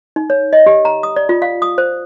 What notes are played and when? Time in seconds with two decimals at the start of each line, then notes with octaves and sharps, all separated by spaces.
0.16 D#4
0.30 C#5
0.53 D#5
0.66 G4
0.85 A#5
1.03 D#6
1.16 D5
1.29 F4
1.42 F5
1.62 D#6
1.78 C5